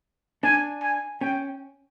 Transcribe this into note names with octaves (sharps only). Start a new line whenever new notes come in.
D4 G#5
G#5
C#4 G5